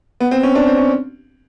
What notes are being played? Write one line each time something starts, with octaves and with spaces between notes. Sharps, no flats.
B3
C4
C#4
D4
C4
C#4